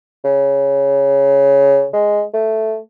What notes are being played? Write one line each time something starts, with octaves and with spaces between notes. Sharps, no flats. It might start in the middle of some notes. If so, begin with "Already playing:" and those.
C#3
G#3
A3